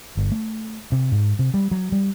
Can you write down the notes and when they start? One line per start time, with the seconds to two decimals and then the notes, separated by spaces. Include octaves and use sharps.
0.17 G1
0.32 A3
0.92 C3
1.12 G#2
1.39 C3
1.54 G3
1.71 F#3
1.92 G3